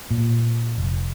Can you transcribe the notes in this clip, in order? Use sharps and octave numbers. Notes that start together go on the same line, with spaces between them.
A#2
F1